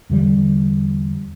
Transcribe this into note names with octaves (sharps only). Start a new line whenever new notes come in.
E2 D3 G3